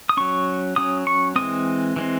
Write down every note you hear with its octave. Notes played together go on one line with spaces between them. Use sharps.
D#6
F#3 C#4 C#6
F#3 C#4 D#6
C#6
E3 G#3 C4 D#6
E3 G#3 C4